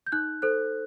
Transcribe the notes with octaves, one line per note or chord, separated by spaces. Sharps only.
G6
D#4 F#6
A4 C5 F#6